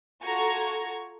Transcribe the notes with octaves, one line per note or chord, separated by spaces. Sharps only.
F4 F#4 A4 A#5 C#6 G#6